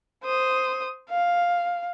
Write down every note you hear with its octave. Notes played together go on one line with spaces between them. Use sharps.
C5 D#6
F5